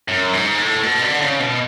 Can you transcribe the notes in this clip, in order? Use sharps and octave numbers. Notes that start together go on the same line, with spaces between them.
F#2
G#2
A2
B2
D3
C#3
B2